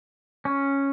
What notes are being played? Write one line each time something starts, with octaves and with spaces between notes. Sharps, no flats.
C#4